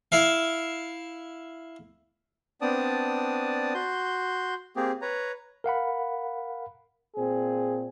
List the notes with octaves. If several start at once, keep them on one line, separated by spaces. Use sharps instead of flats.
E4 E5 F5
B3 C4 D4 D5 A5 D#6
F#4 C6 G6
A#3 C4 G4 G#4
B4 C#5 A#5
A#4 F5 F#5 B5
A#2 C4 G#4